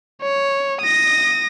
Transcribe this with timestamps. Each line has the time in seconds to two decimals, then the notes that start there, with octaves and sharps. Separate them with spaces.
0.22 C#5
0.81 D#6 A#6